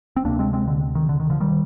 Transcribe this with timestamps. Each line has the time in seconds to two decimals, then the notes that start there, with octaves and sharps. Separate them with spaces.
0.16 C4
0.25 D2 C3 A#3 D4
0.39 G#3 C4
0.53 G#3 C4
0.67 D3
0.95 D#3
1.09 D3
1.20 D#3
1.30 D3 F3
1.40 D#3 G3